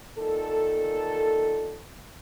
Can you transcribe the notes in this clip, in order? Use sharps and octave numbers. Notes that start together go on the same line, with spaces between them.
A#2 D#3 A4